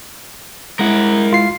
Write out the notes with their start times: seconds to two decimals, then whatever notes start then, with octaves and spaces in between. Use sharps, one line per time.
0.79 G#3 E4 A#4 F#5
1.33 F4 C7